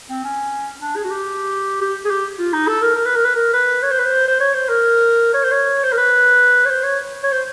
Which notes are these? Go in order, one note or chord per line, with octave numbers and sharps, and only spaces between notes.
C4
C#4
D4
G#4
F#4
G4
G4
G#4
G4
F4
D#4
A4
A#4
A#4
B4
A#4
B4
A#4
B4
C#5
C5
B4
C5
C5
C#5
C5
A#4
C#5
C5
C#5
C5
A#4
B4
C#5
C5
C#5
C#5
C5